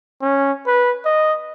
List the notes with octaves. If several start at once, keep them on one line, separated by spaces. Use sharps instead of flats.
C#4
B4
D#5